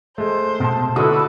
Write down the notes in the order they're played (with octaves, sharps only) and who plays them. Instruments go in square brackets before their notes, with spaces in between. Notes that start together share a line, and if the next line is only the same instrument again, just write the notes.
[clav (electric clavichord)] G#3 A3 [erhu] C5
[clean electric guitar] B2 A5
[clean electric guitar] D3 E4 [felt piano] F#4 A4 D#6 [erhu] B4